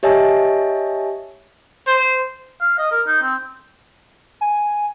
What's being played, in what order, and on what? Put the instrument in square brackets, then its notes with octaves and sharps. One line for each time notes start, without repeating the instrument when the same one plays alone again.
[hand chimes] G4 C#5 D#5 E5 G#5 A5
[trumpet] C5
[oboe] F5
D#5
A#4
D#4
C4
[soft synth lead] G#5